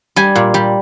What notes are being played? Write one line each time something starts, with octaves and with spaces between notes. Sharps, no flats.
G3 G#5
A#2
G3